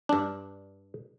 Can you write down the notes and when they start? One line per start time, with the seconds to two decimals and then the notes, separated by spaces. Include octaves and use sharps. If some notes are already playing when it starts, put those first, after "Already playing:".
0.09 G2 D4